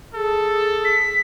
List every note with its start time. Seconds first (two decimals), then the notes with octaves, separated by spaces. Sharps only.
0.15 G#4 A4
0.85 B6